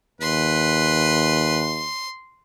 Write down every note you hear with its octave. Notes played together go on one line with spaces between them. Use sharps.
D#2 B4 C6